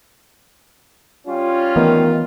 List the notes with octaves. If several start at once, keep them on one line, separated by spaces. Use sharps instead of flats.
G3 C#4 F4
D#3 E3 A3 B3